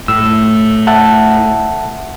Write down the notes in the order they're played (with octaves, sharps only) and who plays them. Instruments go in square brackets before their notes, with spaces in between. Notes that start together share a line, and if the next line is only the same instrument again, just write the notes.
[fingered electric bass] A2 [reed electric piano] E6
[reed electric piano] E5 F#5 A5